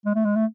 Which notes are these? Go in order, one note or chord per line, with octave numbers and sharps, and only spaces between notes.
G#3
A3
G#3
A3